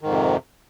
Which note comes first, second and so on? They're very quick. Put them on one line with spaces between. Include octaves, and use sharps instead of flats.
D#3 G#2 F2 C3